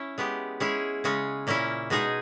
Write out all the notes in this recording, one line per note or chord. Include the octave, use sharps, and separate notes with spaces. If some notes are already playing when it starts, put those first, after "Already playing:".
Already playing: C#4 E4
G#3 B3 G4
G#3 C#4 E4 G#4
C#3 G#3 C#4
A#2 A#3 C#4 E4
B2 G#3 D#4 G#4